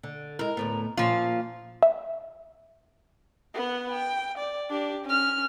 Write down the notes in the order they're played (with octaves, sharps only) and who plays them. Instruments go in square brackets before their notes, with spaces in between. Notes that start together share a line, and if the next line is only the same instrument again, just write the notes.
[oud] D3
[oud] G#3 E4 [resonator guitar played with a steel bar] A#4
[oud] D2 A2 B3
[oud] A#2 C#4 [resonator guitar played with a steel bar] F3 F4
[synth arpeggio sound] E5
[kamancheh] B3 F#5
G5
D5
D4 G4
C#4 F6